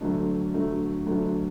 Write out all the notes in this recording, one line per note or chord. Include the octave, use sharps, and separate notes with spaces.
D2 D3 F#3 A3 D4
D2 D3 F#3 A3 D4
D2 D3 F#3 A3 D4